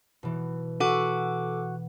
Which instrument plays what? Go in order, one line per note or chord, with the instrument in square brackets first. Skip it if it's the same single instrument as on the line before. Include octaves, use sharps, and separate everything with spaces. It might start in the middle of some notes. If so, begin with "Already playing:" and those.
[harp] B2 E3
[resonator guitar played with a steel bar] F#4 [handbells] A4 D6